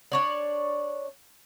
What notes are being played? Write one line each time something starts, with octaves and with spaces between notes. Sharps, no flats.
D4 C#5 D5